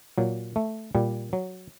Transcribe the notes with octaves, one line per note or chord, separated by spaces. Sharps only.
A#2 F#3
A3
A#2 G3
F#3